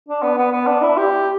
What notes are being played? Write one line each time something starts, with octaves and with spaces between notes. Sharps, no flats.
D4
B3
B3
B3
D4
E4
G4